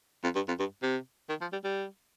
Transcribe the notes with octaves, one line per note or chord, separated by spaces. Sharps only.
F2
G2
F2
G2
C3
D#3
F3
G3
G3